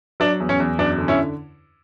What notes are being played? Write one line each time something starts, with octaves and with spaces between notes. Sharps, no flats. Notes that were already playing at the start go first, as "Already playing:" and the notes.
F#3 D4
E2
C#4
E2
F#2 D4
D3
C#4 E4